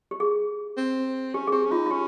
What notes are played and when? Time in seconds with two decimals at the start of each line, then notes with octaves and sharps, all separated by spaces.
0.11 G4
0.20 G#4
0.77 C4
1.34 C#4 G4
1.47 G#4
1.52 C4 G4
1.65 C#4
1.71 D#4 F4
1.86 F4
1.91 C#4 G4